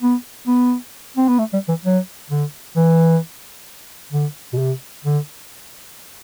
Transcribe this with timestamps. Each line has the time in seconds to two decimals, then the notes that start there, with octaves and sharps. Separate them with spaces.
0.02 B3
0.47 B3
1.17 C4
1.28 B3
1.39 A3
1.53 G3
1.69 E3
1.85 F#3
2.30 D3
2.76 E3
4.12 D3
4.53 B2
4.58 C3
5.05 D3